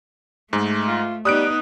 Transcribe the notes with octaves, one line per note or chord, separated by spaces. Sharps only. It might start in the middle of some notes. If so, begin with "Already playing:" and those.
G#2 G#3 A3
F4
G3 B3 D#4 D#6 F#6 D7